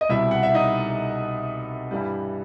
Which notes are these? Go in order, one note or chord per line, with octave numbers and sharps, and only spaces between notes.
D#5
C2 B2 G3 E4 E5
F#5
E5
D#4 D#5
G2 E3 G3